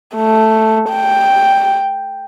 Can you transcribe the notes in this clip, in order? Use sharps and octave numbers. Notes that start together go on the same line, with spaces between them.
A3
G5